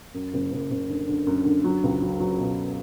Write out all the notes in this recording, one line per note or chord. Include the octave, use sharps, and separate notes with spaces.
F#2
F#1
F#1
F#1
D3
D3
F#2
D3
F#3
C#2
F#3
F#3
B2